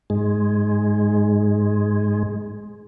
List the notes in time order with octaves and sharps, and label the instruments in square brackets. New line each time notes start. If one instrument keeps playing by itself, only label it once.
[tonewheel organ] G#2 G#3